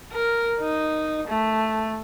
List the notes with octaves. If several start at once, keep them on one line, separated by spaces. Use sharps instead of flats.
A#4
D#4
A3